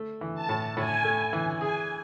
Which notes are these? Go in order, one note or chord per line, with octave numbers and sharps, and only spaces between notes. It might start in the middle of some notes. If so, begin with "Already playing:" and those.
Already playing: A3
E3
A5
A2
A2 G#5
A3
E3
G#4 G#5